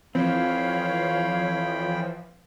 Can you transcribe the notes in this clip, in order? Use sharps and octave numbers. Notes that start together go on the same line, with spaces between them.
F2 E3 F3 C4 C#5 F5 G5 B5